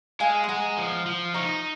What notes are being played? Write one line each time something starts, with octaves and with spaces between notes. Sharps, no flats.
G#3 F5 G#5
C6
G#3 F#5 A#5
F3
F3
D#4 A#5 C#6